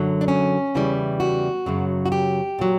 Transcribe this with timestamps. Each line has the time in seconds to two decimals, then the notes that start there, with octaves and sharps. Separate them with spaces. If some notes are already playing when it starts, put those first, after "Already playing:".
Already playing: F#2 D3 F#3
0.21 D4
0.28 C#4
0.75 E2 C#3 E3 G3
1.20 F#4
1.66 F#2 C#3 F#3
2.06 F#4
2.12 G4
2.59 A#2 F#3